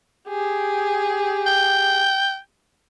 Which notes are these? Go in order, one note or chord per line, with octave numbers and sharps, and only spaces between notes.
G4 G#4
G5